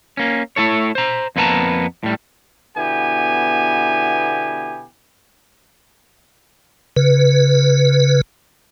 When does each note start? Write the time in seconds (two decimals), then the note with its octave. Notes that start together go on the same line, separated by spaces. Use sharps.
0.17 A#3 C#4
0.56 A3 E4 A4 C#5
0.95 C5 A#5
1.36 F2 A#3 B3 B4 A5 A#5
2.03 A2 G3
2.77 B2 D3 B3 E4 G4 G#5
6.96 C#3 B4